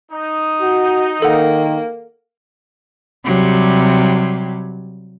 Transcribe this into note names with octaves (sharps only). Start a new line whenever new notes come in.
D#4
F#4
D#3 A#3 A4 F#5
C3 F#3 G3